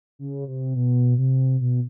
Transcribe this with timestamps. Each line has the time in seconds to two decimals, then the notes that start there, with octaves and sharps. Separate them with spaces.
0.19 C#3
0.48 C3
0.76 B2
1.18 C3
1.61 B2